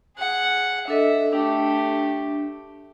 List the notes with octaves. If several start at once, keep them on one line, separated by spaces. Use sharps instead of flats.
G#4 F#5
D4 A4 D#5 E5
A3 D4 G4